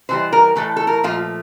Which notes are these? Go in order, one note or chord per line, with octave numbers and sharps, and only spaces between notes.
C3 E3 G3 C5
A#4
A2 E3 A3 A4
A4
A#4
A#2 F3 A3 F4